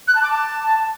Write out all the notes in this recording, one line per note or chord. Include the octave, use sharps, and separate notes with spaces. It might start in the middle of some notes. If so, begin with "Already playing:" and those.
F#6
A5
D6
A5